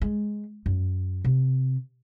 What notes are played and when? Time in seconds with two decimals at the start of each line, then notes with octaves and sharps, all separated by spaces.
0.02 G#3
0.66 F#2
1.24 C3